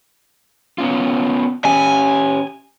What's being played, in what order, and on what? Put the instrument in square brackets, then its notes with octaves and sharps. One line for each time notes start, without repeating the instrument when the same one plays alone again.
[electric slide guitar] B3 C#4 F4
[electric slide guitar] C#4 G4 [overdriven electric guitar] G#5